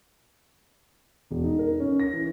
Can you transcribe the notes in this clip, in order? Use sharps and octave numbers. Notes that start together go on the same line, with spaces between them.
E1
D#4
A#4
C#4
A#6
E3